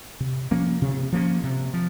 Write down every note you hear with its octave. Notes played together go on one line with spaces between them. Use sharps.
C3
F3 A#3 C#4
C3
F3 A#3 C#4
C3
F3